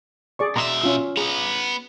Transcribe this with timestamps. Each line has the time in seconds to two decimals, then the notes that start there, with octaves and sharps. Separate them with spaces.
0.39 G#4 D5 C#6
0.56 B2 E5 A#5 C6 D#6
0.81 C#4 F4 E6
1.17 B3 G#4 A#5